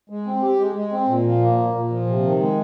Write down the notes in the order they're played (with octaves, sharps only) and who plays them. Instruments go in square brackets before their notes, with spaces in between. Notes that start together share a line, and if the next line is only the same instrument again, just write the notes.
[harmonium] G#3
C4
G4
G#3
G#3
C4
A#2
F3
A#3
A#2
A#2
F3
C3
D#3
G#3